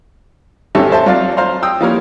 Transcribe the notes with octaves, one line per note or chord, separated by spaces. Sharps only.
G#1 C4 C#4 G4 A4 E5
A4 C5 E5 A5
F#3 C4 F4 D5 F5
F4 C5 F5 A#5 C6
G5 D#6 E6
F3 G3 A#3 E4 A#4 C#5